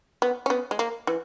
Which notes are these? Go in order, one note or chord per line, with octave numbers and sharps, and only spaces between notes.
B3
C#4
B3
G#3
A#3
E3